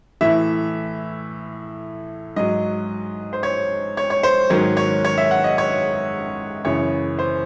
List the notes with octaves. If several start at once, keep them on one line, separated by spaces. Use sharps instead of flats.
A2 E3 E5
G#2 F#3 D#5
C5
C#5
C#5
C#5
C5
G#2 D#3 F#3 C#5
C#5
C#5
E5
F#5
D#5
C#5
F#2 C#3 E3 C#5
C5